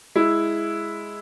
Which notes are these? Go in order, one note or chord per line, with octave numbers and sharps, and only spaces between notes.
G#3 E4